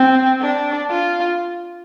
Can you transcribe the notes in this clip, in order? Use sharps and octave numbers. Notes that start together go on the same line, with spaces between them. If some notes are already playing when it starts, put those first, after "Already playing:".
Already playing: C4
D4
F4